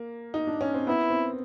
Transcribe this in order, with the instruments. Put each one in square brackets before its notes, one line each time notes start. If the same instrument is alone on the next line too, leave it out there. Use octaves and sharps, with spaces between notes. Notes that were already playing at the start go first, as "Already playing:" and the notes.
Already playing: [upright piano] A#3
D#4
D4
C#4
C4
[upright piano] B3 [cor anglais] E4
[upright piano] C4